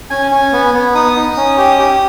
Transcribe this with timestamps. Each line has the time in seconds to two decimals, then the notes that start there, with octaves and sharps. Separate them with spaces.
0.10 C#4 G#5
0.31 C#4
0.53 B3
0.74 B3
0.95 D#4 D#6
1.16 D#4
1.37 C#4
1.58 G4
1.79 G4